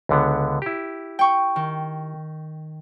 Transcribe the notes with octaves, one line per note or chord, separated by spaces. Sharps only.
C#2 D3 B3
E4 G4
G5 C#6
D#3